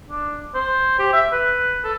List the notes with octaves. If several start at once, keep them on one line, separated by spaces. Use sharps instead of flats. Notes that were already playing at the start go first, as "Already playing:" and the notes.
D4
C5
G4
E5
B4
A4